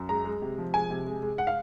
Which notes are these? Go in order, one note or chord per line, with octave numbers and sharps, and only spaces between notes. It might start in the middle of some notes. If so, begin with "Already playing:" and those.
Already playing: F#2
G#3 A#5
G#3
C3
F3
G#3 G#5
C3
G#3
G#3
F#5
F5